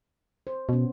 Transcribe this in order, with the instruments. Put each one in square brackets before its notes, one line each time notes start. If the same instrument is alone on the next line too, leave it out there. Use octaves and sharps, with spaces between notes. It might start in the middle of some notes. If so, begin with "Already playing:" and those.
[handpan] C5
[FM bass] B2 [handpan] B3 C#4